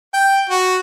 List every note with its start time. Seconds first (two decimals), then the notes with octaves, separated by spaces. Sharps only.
0.14 G5
0.49 F#4